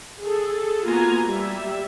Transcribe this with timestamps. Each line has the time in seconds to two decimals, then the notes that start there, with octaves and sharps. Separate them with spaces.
0.20 G#4 A4
0.85 A#3 B3 F4 F#4 G#5 A#5
1.27 G3 E5